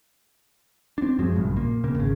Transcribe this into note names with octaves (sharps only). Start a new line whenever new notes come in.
C4 D4
F#2 F3 F#3 G#3
A#1 G2 C#3
A#2 A#3
D#1 C#3 A#3
G#1 C#3